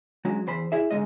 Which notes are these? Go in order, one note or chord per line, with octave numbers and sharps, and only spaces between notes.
F#3 G#3 C#4 D4 F#4
E2 C5 B5
E4 G#4 E5
G#2 D3 D#3 G#3 D#5